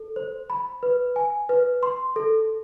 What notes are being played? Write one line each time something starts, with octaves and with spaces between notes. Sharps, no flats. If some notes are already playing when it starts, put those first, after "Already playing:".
Already playing: A4
C5
B5
B4
G#5
B4
C6
A4